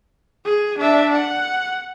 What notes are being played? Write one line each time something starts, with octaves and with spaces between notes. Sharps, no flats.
G#4
D4 E5
F#5